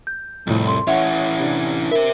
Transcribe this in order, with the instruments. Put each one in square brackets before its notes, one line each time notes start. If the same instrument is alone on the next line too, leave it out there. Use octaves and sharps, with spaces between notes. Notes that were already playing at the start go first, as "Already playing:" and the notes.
[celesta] G6
[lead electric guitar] C2 [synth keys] F2 A2
[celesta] C6
[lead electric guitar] E3 C#4 [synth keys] C#5 [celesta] E5 F#5
[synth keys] C3 D4
[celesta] A#4 [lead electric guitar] C5 E5